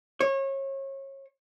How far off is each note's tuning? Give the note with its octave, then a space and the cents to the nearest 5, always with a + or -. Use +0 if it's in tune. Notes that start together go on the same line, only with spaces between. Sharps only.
C#5 -30